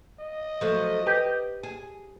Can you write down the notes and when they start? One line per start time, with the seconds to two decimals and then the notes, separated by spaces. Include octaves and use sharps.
0.20 D#5
0.61 F3 F#3 A3
1.07 G4 B4
1.63 G#4